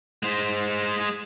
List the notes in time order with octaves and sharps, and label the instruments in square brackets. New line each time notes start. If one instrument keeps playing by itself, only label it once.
[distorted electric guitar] G#3 C5